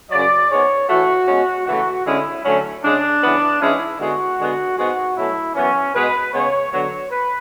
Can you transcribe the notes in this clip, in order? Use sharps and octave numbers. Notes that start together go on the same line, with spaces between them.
F#2 C#3 F#3 D5
G#2 G#3 B3 C#5
A2 E3 A3 F#4
B2 G#3 C#4
C#3 E3 A3 F#4
D3 G#3 C#4 E4
D3 F#3 A3 C#4
C#3 G#3 C#4 D4
C#3 E3 B3
G#2 E3 G#3 C#4 E4
D3 G#3 B3 F#4
D3 G#3 B3
G#2 G#3 B3 F#4
B2 F#3 A3 C#4 E4
F#2 E3 B3 C#4
B2 G#3 B3 B4
C#3 G#3 B3 C#5
D3 F#3 B3 C#5
B4